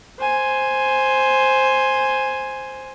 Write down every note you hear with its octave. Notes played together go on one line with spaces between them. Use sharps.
C5 G#5